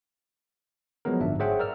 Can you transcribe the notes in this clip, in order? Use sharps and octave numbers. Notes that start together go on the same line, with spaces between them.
F3 F#3 G#3 B3 A#4
G1 G#2 D4 E5
G#4 C5 C#5 E5 F#5 G5
A#4 D5 E6 F6